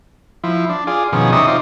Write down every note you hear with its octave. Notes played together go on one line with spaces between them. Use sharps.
F3 E4
D4
F4 G#4 D5
B2 D#3 F3 C#4 G#4
C3 D#4 D5 E5 C#6 D#6
D#4 F4 C5 D5